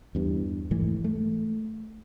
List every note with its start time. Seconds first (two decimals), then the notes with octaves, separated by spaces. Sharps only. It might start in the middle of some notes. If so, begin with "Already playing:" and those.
0.15 E2 G2
0.71 G#2 E3 A3
1.04 A3